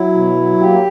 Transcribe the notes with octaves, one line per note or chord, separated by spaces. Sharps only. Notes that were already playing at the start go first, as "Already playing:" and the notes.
Already playing: F#3 E4
B2
F#3
A#3 G4